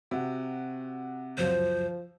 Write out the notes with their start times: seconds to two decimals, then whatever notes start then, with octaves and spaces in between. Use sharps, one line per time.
0.11 C3 F#4
1.38 C#2 F#2 F3 F#3 C5